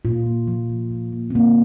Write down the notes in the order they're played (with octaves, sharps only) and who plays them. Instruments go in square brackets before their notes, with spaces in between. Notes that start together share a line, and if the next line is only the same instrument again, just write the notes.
[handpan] A#2 F4
A#3
F3
A#2
A#2
A#3
C4
D3 A#3